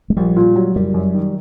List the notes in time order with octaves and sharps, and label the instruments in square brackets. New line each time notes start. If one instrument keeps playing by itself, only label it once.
[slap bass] G#3
[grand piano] A#1 [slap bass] G3
[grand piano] A#2
F#3
[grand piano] F#1 [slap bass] G3
[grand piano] F#2
D#3